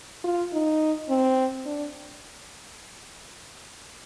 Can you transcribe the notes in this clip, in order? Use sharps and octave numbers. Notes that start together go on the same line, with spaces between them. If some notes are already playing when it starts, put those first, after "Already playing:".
F4
D#4
C4
D4